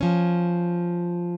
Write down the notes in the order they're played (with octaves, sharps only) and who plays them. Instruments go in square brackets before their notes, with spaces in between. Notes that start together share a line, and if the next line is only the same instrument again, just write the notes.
[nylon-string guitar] F3 C#4